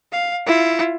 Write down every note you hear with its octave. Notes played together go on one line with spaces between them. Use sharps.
F5
E4 F4